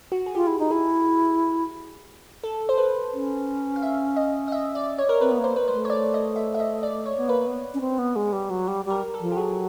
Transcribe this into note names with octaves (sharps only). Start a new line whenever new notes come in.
F#4
G#4
F4 G4
E4
D#4
E4 G#4
A4
C5
B4
C#4
F5
E5
D#5
D#5
E5
D5
C#5
A#4
C4 B4
B3
A#3
C5
B4
G#3 A3 C5
C#5
D5
D#5
E5
E5
D#5
D5
C#5
B3
A#3 B4
B3
C#4
C4
B3
G#3
G3
F#3
G3
G3
A#4
A4
F3
G4
F#3 G#4